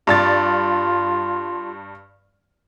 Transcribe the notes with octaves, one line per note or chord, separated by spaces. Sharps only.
G2 F4 D5 A6